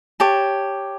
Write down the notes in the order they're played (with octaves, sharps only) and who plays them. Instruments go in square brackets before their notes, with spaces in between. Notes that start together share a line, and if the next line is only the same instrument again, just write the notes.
[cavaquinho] G4 C#5 A5